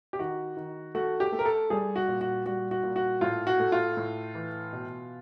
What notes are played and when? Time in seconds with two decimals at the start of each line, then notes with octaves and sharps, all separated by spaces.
0.13 G4
0.19 D#3 F#4
0.57 D#3
0.95 A3 F#4
1.20 G4
1.32 A3
1.39 A#4
1.46 A4
1.70 G3 G#4
1.96 F#4
2.08 A#2
2.21 F#4
2.46 G3 F#4
2.71 F#4
2.83 A#2
2.96 F#4
3.21 A2 F4
3.47 F#4
3.59 A3
3.72 F4
3.97 A2
4.35 E3
4.73 B2